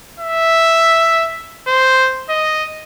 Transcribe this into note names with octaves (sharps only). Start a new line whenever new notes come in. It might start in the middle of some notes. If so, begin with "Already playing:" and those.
E5
C5
D#5